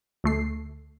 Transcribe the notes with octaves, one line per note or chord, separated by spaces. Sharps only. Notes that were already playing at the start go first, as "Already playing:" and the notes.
D2 A3 C7